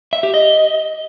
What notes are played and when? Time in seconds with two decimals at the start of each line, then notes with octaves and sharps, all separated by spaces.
0.13 E5
0.23 G4
0.34 D#5